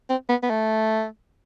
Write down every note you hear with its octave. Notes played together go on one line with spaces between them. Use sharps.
C4
B3
B3
A3